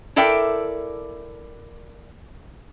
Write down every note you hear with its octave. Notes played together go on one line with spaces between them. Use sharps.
E4 A4 A#4 D5 E5 G5